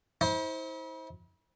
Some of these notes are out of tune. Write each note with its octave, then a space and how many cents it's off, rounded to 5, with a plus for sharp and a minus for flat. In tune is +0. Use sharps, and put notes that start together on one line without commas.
E4 -40 C5 +10